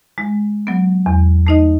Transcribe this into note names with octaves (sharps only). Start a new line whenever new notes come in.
G#3
F#3 B3
E2
A3 D#4 D#5